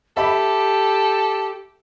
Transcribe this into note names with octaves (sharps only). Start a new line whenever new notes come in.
G4 A4 E5 B5